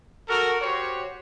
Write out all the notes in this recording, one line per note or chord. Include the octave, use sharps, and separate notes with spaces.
F#4 A4 A#4
F#4 G4 C5 C#5